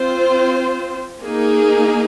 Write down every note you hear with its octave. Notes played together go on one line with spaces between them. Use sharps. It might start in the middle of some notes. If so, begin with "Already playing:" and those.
Already playing: C4 F4 C5
A#3 D#4 G#4